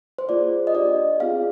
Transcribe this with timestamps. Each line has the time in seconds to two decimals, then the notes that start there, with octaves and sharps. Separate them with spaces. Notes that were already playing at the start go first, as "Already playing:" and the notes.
0.18 C5
0.29 A#3 F4 G#4 D5
0.67 D#5
0.75 D4 G4 D5
1.20 C4 F4 G#4 F5